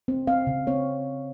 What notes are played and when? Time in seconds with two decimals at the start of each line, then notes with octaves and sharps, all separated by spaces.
0.08 C4
0.27 C4 F5
0.47 C#3
0.67 C4 C#5